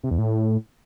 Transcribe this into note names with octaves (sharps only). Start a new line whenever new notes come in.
C3
E2
A2